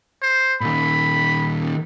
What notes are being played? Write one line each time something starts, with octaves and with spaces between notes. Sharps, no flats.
C5
A#2 D#3 B5